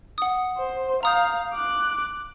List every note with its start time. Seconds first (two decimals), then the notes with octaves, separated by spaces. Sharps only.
0.18 F#5 D#6
0.58 C5
1.03 F5 A#5 D#6 G6
1.54 D6 F#6